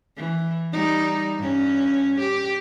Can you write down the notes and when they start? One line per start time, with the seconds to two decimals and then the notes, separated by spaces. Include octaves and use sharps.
0.17 E3
0.72 G3 D#4
1.38 G2 C#4
2.20 G4